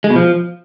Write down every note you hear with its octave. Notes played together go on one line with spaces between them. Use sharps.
G#3
B2
F3